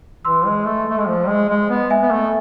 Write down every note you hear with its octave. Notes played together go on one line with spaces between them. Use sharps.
E3 C6 E6
G#3
A3
A3
G#3
F3
G#3
G#3
B3
E5 G#5
B3
A3